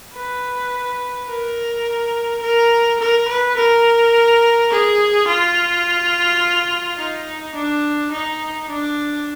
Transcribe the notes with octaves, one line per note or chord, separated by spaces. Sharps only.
B4
A#4
A#4
A#4
B4
A#4
G#4
F4
D#4
D4
D#4
D4